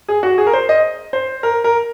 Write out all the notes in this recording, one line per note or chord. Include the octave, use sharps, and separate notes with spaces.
G#4
F#4
G#4
A#4
C5
D#5
C5
A#4
A#4